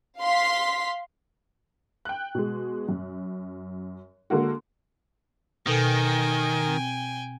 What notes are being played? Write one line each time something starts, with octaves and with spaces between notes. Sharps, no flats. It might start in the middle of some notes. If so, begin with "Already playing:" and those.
F5 C6 B6
G5 F#6
B2 G#3
F#2
D3 G#3 A#3 F#4
B2 D#3 A4 G5 G#5
C4